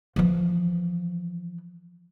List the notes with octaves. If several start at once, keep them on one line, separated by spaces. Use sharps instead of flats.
E3 F3